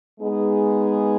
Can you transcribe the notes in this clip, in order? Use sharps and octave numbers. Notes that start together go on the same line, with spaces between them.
G#3 B3 D#4 G#4